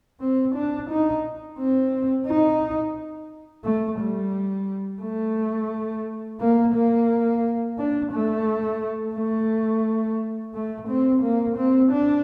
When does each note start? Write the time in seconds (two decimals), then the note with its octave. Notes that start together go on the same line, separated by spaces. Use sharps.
0.20 C4
0.55 D4
0.90 D#4
1.58 C4
2.27 D#4
3.64 A3
4.00 G3
5.02 A3
6.40 A#3
6.75 A#3
7.78 D4
8.12 A3
9.15 A3
10.54 A3
10.88 C4
11.23 A#3
11.57 C4
11.92 D4